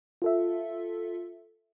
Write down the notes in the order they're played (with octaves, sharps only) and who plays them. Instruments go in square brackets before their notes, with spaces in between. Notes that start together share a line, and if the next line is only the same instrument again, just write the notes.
[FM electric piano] F4 A4 E5